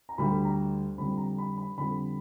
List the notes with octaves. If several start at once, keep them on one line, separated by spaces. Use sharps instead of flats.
A#5
D2 D3 G3 B5
A#5
F2 D3 G3 B5
A#5
B5
B5
F2 D3 G3 B5